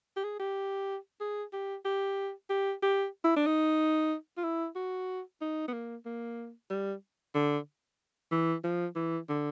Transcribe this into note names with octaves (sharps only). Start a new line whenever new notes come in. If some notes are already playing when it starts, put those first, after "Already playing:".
G4
G#4
G4
G#4
G4
G4
G4
G4
E4
D4
D#4
F4
E4
F#4
D#4
B3
A#3
A#3
G3
D3
E3
F3
E3
D3